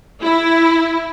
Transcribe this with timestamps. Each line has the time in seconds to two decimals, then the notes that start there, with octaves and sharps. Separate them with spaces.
0.23 E4